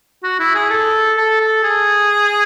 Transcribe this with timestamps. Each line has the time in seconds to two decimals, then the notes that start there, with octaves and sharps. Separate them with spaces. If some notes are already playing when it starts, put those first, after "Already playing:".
0.23 F#4
0.39 E4
0.55 G#4
0.70 A4
1.17 A4
1.40 A4
1.63 G#4